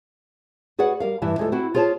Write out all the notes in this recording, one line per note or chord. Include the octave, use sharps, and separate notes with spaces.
F#4 G#4 B4 D5 F#5
G3 A#4 F5
G2 E3 E4 G#5
D2 G#3 F4 A4
C4 E4 F#4
F4 G#4 C5 C#5 A5